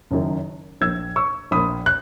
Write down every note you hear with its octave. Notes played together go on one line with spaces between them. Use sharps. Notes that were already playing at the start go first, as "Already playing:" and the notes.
F#1 F#2 D#3
A#1 A#2 E6 G#6
C#6 E6
A#1 A#2 B5 D#6
F#6